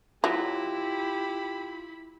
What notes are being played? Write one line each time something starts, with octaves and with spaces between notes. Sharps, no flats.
F#3 E4 F4 G4 B5